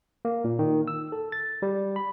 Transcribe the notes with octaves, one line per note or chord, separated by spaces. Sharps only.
A#3
A#2
D#3
E6
A4
A6
G3
B5